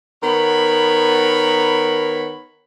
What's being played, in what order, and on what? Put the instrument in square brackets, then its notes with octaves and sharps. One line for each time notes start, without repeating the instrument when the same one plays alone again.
[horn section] D#3 B3 A#4 C#5 B5